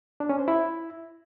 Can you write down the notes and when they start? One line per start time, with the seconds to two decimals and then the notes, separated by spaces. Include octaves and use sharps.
0.20 D4
0.29 C#4
0.39 C5
0.48 E4